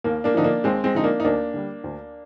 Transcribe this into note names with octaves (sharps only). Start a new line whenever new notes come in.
D#2 A#3
A#3 D4
D3 F3 D#4
A#3 D4
D#2 G#3 C4
G#3 C4
D3 F3 D#4
A#3 D4
D#4
D2 A#3 D4
D3 G3
D2